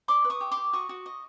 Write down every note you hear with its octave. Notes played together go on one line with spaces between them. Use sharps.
D5 C6 D6
B4
C#6 D#6
G4
C6 D6
G4
F#4 C#6 D#6
F#4
D#5